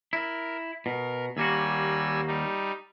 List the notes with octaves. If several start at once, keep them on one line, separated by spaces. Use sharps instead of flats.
E4 A#4
B2 A#4
D#2 G3 A#3 F#4 G#5 E6
G3 D#4